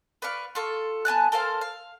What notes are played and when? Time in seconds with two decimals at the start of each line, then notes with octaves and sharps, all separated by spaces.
0.22 B4 D5 F5 C#6
0.55 F4 A4 C#6
1.05 B3 G#5 A5 F#6
1.32 A4 A#4 C5 F5
1.61 F5